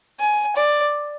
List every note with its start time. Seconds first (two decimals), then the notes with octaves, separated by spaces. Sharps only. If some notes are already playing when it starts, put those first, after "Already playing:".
0.20 G#5
0.57 D5